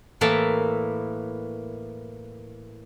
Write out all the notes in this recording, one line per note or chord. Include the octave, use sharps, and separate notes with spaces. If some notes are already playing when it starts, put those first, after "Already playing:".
A2 E3 A#3 E5 A5